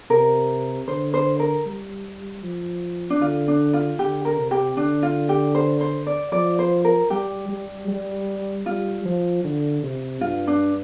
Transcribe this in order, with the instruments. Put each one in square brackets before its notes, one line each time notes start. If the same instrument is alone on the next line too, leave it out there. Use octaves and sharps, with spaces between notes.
[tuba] C3 [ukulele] A#4
[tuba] D3 [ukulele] C5
[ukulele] C5
A#4
[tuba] G3
F3
[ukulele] D4
[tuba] D3 [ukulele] F4
[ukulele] D4
F4
[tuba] D3 [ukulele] G4
[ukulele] A#4
[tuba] C3
[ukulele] G4
[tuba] D3 [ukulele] D4
[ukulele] F4
G4
C5
C5
D5
[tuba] F3 [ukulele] D5
[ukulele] C5
A#4
[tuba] G3 [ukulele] G4
[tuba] G3
G3
[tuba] G3 [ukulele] F4
[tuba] F3
D3
C3
[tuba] G2 [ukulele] F4
[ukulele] D4